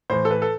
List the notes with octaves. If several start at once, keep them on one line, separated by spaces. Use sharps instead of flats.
A2 E3 C5
A4
B4
A4